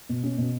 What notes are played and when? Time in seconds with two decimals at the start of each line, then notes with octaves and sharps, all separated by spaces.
0.09 B2
0.23 C#4
0.38 B2